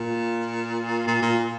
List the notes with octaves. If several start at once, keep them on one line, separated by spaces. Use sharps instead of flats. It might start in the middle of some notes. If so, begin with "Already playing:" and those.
Already playing: A#2
A#2
A#2